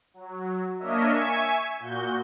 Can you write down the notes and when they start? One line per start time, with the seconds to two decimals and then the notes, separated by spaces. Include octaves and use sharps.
0.14 F#3
0.79 A#3 D4 A#4 C#5 D#5 E5
1.11 E5 G#5 C#6 G#6
1.80 A#2 F#4 G6